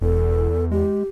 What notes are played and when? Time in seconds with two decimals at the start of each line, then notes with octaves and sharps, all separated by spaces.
0.01 E1 E2 A4
0.71 G#3 G4